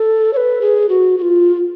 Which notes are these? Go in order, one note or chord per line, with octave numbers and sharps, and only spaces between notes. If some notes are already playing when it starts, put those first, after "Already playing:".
Already playing: A4
C#5
B4
G#4
F#4
F#4
F4